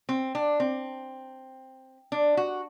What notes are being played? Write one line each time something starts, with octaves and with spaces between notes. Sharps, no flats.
C4
D4
C4
D4
F#4